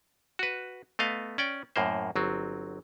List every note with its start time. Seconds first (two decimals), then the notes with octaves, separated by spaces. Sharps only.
0.39 F#4 B4
0.99 A3 B3 D#5 F5
1.38 C#4 D5 G5
1.76 F#2 A2 A#3 C5
2.16 G1 F#3 C4